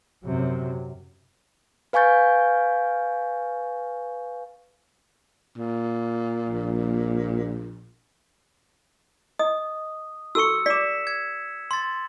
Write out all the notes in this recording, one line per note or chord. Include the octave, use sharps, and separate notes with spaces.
F#2 C3 F#3
B4 F5 G#5 C#6 G6 A6
A#2
A#1
D#5 D#6
F#4 A4 C#6 E6 C#7
D5 D6 B6 E7
G#6
C6 A6